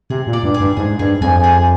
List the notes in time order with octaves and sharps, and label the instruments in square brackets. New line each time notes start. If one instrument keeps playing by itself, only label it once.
[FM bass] C3 [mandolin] G#4
[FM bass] A#2
[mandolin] D5
[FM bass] G2
[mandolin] G#4
[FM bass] G2
[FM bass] G#2 [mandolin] G#4
[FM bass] G2 [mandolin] G#4
[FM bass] F2 [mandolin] G#5
[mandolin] G#4